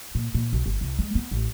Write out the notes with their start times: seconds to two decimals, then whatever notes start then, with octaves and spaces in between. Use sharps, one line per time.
0.15 A#2
0.34 A#2
0.53 B1
0.66 G1
0.81 C2
0.99 G#3
1.15 B3
1.31 A1